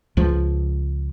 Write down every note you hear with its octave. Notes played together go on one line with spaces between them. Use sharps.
C#2 F3